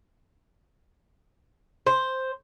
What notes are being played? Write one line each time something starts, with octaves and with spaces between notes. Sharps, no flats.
C5